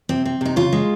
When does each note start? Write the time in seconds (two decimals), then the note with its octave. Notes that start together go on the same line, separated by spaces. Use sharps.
0.09 C3 C4
0.26 C4
0.41 C3 D#4
0.56 C#3 F4
0.73 G#3